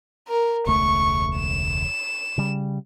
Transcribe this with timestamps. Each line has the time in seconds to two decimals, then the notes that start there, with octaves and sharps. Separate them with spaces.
0.28 A#4
0.67 E1 C#2 A3 C#6
1.36 E7
2.38 C#3 G3